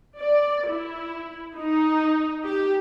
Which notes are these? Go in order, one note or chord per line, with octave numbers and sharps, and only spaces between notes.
D5
E4
D#4
G4